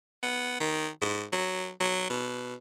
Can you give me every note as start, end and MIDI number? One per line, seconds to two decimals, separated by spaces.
0.23 0.60 59
0.60 0.88 51
1.02 1.24 44
1.32 1.71 54
1.80 2.08 54
2.10 2.54 47